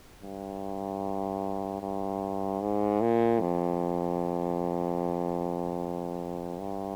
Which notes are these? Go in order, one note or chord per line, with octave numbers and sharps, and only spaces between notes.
G2
G2
G#2
A#2
F2
G2